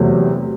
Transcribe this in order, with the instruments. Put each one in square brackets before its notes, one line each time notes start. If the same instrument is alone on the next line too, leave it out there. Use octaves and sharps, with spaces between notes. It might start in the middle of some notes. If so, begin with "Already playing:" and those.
Already playing: [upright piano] E2 C3 F#3 A3